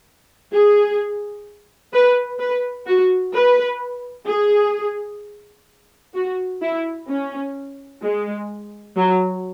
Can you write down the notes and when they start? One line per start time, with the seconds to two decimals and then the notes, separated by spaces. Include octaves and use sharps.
0.52 G#4
1.93 B4
2.39 B4
2.86 F#4
3.34 B4
4.27 G#4
6.15 F#4
6.62 E4
7.09 C#4
8.03 G#3
8.97 F#3